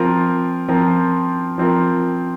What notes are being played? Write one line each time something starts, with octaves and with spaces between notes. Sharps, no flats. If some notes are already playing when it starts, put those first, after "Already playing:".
Already playing: F3 C4 F4 A#4
F3 C4 F4 A#4
F3 C4 F4 A#4